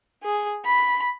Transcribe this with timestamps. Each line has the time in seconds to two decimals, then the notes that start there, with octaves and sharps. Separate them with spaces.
0.23 G#4
0.66 B5